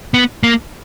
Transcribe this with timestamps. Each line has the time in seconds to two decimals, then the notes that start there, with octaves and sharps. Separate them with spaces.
0.14 B3
0.43 A#3